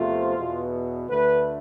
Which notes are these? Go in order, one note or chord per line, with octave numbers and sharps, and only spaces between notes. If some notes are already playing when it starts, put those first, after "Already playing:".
Already playing: E2 C3 F3 A3 F4
E2 B2 B3
D2 D3 A3 B4